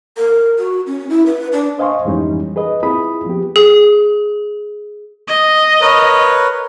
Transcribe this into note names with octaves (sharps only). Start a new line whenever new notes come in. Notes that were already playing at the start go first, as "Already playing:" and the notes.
A#4
F#4
C#4
E4
B4
D4
C5 D#5 F5 G#5 C6 C#6
F2 G#2 E3 G3 C#4 D#4
G#4 B4 D#5
C4 E4 F4 G#4 B5 D#6
F3 B3 G4
G#4
D#5
A#4 B4 C#5